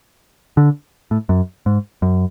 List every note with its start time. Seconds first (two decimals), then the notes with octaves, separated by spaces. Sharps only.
0.57 D3
1.11 A2
1.29 F#2
1.66 G#2
2.02 F#2